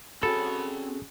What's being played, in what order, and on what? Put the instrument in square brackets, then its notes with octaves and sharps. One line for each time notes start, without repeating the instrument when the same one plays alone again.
[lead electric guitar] C4 B5 [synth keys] C#4 F#4 G#4 [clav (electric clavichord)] A4